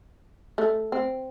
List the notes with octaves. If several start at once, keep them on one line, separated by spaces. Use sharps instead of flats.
A3
C4